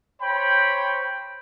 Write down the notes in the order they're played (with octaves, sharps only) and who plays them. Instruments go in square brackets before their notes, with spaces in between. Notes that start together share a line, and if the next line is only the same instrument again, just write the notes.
[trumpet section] C5 C#5 G5 B5